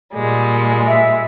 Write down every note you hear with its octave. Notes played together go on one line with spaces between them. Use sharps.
A#2 G3 G#3
E5